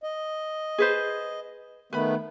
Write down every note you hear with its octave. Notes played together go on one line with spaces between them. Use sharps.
D#5
G#4 B4 C5
D#3 A3 B3 B4 B5